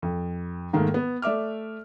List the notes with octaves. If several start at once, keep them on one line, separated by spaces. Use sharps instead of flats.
F2
G#2 D#3 A3 A#3
B3
A3 D5 E5 D6 F6